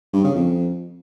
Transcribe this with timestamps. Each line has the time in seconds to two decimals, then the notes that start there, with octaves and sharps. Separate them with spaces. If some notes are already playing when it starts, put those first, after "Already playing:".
0.13 G2
0.24 C#3
0.36 F2